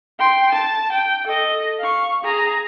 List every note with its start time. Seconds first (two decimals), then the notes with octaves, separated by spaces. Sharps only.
0.18 G5 C6
0.52 A5
0.92 G5
1.27 A4 D#5
1.80 F5 C#6
2.24 G#4 A#5